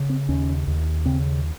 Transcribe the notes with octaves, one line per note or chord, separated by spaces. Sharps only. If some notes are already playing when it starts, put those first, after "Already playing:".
Already playing: C#3
C4
D#2 C#4
D#2
C#3 C4